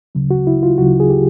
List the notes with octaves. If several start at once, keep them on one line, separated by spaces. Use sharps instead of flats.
D2 C#3 F#3
F#4
E4
F4
D2 C#3 F#3 F#4
G#4
G4